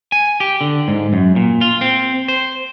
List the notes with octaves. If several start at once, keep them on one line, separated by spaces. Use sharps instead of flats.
G#5
G4
D3
G#2
F#2
A#2
F4
C4
C5